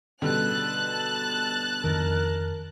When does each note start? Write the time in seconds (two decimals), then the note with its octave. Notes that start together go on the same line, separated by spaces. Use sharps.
0.22 B2 D3 G3 A5 F#6
1.84 F2 D#3 A#4